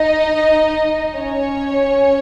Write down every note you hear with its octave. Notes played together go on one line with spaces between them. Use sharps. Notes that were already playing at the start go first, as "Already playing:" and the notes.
Already playing: D#4 D#5
C#4 C#5